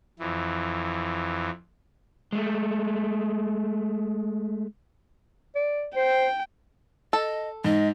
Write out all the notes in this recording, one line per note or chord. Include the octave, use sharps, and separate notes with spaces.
F2 E3
G#3 A3
D5
C5 G5
A4 D#5
G#2 D#5